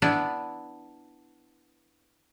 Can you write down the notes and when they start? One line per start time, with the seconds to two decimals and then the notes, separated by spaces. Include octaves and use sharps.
0.02 B3 D4 E4 B4